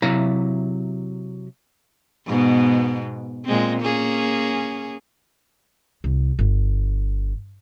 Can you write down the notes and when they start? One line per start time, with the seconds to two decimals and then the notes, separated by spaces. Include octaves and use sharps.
0.02 C3 F#3 E4 F5 A#5
2.26 G#2 B2 B3
3.45 A#2 G#3 C4
3.81 A#3 C#4 G#4
6.04 C2
6.39 G1